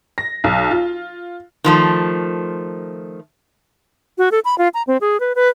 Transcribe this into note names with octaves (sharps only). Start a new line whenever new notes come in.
A#6
B1
F4
D#3 F3 A3
F#4
A4
B5
F4
A#5
C4
G#4
B4
B4